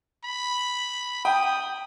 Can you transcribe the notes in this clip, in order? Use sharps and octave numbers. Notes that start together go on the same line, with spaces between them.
B5
G5 D#6